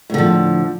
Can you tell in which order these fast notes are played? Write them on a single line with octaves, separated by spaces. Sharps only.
A2 D3 F3